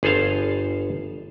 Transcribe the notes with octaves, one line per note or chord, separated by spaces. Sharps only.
G1 G#4 A4 C5 F5